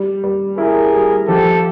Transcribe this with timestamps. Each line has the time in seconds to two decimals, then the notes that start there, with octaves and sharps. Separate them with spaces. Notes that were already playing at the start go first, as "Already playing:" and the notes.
Already playing: G3
0.24 G3
0.58 E4 G#4 A#4
0.93 G3
1.27 F3 G4 A4